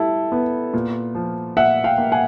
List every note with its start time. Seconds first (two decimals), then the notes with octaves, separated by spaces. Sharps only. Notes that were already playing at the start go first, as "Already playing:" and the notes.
Already playing: G3 E4 A4
0.32 B3
0.73 A#2
1.15 F3
1.57 A#2 E5 F#5
1.84 F5 G5
1.98 A#3
2.12 F#5 G#5